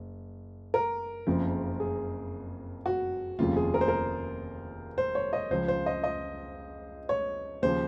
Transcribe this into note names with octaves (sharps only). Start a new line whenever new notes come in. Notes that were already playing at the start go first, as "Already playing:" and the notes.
Already playing: F#1
A#4
F#1 F2 C#3 F3
G#4
F#4
F1 D#2 C#3 F3 F4
G#4
A#4
C5
A#4
C5
C#5
D#5
C#2 C#3 F3 C5
C5
D#5
D#5
C#5
D#2 C#3 F3 C5